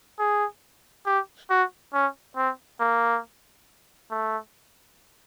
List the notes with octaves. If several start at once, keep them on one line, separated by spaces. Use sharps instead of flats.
G#4
G4
F#4
C#4
C4
A#3
A3